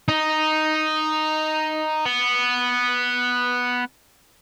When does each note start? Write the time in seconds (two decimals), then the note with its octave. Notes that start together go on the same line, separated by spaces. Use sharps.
0.08 D#4
2.06 B3